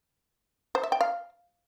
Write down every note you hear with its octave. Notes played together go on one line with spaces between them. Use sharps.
C5
E5
G5
F5